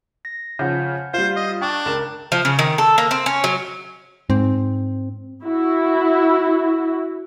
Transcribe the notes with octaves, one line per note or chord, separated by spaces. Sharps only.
A#6
C#3 F3 F#5 G6
G3 F4 C5 F5
D#5
D4 G5 C#6
C#2 A#4 E7
F3
C#3
D#3
A4
A#3
C4
C#4
F#3
G#2 C4
E4 F#4